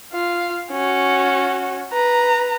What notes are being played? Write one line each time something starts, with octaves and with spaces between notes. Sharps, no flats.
F4 F5
C#4 F#4
B4 A#5